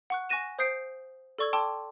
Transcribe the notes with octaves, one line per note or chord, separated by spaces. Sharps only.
F#5 C#6 F#6
G#5 C#6 F#6 A#6 D#7 E7
C5 D#6 G6 C7 D7
A4 D5 C#6 E6 G#6
G5 A5 C6 D6 E6